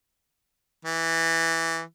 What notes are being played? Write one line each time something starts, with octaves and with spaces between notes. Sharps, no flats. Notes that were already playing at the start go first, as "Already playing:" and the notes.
E3